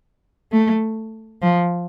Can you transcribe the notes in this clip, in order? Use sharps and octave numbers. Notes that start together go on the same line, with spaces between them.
A3
F3